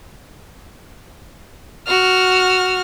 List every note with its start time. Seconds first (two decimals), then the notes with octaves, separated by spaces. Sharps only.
1.87 F#4 F6